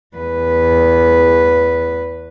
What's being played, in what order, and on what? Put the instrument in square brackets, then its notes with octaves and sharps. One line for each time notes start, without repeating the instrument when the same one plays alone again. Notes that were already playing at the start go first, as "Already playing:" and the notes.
[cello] E2 B4